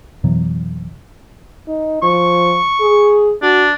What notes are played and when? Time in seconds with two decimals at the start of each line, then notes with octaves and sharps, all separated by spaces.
0.24 F2 B2 E3 F#3
1.68 D#4
2.03 F3 C#6
2.80 G#4
3.42 D4 F#4